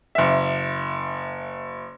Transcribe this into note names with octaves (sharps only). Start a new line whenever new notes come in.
F#1 E5